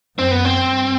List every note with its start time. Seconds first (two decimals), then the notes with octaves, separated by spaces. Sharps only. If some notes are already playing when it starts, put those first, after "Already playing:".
0.18 F#2 C4
0.31 B3
0.45 C4
0.67 G2